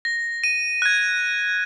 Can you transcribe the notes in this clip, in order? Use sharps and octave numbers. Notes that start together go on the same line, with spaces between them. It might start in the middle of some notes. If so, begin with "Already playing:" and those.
A#6
D#7
F#6 G#6